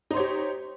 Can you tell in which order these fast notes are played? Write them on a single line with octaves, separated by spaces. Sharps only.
D#4 C5 C#5 G4